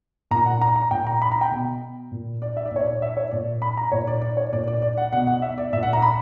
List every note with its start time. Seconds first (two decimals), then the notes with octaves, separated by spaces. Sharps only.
0.31 A#2 A#5
0.46 F#5
0.61 A#5
0.76 A#5
0.91 A#2 G5
1.07 A#5
1.22 B5
1.32 A#5
1.41 G5
1.51 B2
2.12 A#2
2.42 D5
2.57 E5
2.66 D5
2.71 A#2 C#5
2.84 D5
3.02 E5
3.17 C#5
3.31 A#2 D5
3.62 B5
3.77 A#5
3.92 A#2 C#5
4.07 D5
4.22 D5
4.37 C#5
4.52 A#2 D5
4.68 D5
4.82 D5
4.98 F#5
5.13 B2 F#5
5.27 F#5
5.42 E5
5.58 D5
5.73 A#2 E5
5.83 F#5
5.93 A#5
6.02 B5